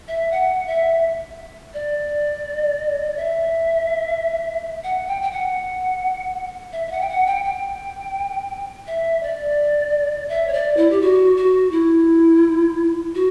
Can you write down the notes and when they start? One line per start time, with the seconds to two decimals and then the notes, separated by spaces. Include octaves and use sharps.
0.08 E5
0.31 F#5
0.67 E5
1.74 D5
3.16 E5
4.84 F#5
5.08 G5
5.22 G5
5.31 F#5
6.73 E5
6.87 E5
6.91 F#5
7.01 G5
7.09 F#5
7.26 G5
7.45 G5
8.87 E5
9.23 D5
10.29 E5
10.47 C#5
10.53 D5
10.77 E4
10.90 G4
11.01 F#4
11.37 F#4
11.71 E4
13.15 F#4